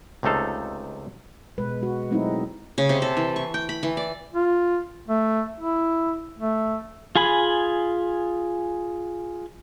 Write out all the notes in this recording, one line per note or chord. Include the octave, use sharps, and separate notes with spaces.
C#2 C3 A3 D#4 A4 F5
B2 G#3 B4
G#3 F#4
F#3 G#3 A3 C4 D#4 E4
C#3
C3
A4
E3
C#6
G5
B5
E3
D5
F4
A3
E4
A3
F4 G#4 G#5 B5